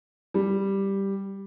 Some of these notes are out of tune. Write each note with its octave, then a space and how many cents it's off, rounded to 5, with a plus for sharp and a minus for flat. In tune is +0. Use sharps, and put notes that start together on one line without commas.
G3 +0